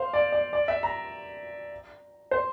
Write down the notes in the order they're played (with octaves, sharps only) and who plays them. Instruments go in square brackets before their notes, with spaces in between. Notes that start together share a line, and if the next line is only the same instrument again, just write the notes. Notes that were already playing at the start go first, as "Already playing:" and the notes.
Already playing: [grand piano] C5 F5
D5
D5
D5
E5
A#5
C5